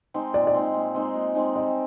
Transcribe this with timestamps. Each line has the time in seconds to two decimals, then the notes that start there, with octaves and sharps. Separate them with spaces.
0.14 G#3 C4 D#4
0.34 A#2 D5
0.47 D5
0.54 G#3 C4 D#4
0.74 A#2
0.94 G#3 C4 D#4
1.14 A#2
1.35 G#3 C4 D#4
1.55 G3 D#5